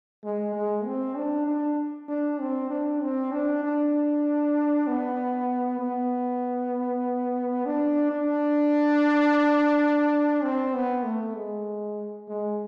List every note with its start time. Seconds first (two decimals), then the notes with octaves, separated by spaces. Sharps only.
0.24 G#3
0.54 G#3
0.85 C4
1.16 D4
1.47 D4
2.09 D4
2.40 C4
2.70 D4
3.02 C4
3.32 D4
3.64 D4
4.87 B3
5.79 B3
7.66 D4
8.11 D4
10.43 C4
10.74 B3
11.04 A3
11.35 G#3
12.29 G#3